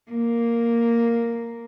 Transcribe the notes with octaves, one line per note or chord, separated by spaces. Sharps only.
A#3